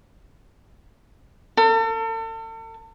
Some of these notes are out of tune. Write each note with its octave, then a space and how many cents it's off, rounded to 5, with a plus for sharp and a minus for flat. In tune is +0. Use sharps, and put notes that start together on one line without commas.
A4 +40